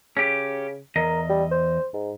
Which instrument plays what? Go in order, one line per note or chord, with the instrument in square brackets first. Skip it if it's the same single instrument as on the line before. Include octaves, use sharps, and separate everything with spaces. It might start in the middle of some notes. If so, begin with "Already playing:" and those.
[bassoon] C#3 [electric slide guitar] C#4 G4
[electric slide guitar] E2 D#5 [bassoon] A#4
[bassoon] G3
C5
G#2